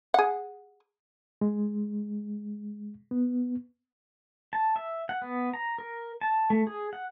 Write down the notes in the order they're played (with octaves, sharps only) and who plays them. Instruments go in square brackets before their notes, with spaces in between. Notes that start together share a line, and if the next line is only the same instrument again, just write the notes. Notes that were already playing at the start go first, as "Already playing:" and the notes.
[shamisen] G#4 F#5
[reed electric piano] G#3
B3
[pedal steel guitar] A5
E5
F#5
B3
A#5
A#4
A5
A3
G#4
F#5